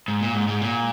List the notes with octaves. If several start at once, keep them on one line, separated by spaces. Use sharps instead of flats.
G#2
A#2
G#2
G#2
A#2